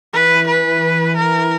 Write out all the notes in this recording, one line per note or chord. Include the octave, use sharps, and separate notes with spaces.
E3 B4
B4
E3
A#4